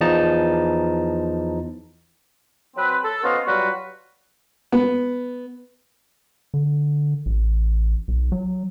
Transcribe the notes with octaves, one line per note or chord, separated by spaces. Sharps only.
E2 E3 F3 D#4 A5 A#5
F#3 C4 B4
A4
B3 C#4 F#4 C5 D#5 F5
F#3 G3 F4 F#4 B4
B3
D3
A1
B1
F#3